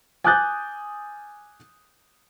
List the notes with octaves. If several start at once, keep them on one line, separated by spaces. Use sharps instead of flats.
G#5 D6 D#6 F#6 G6 A6